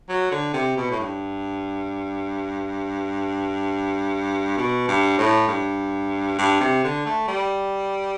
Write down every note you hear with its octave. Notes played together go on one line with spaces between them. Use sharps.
F#3
D3
C3
B2
A2
G2
B2
G2
A2
G2
G2
C3
D3
A3
G3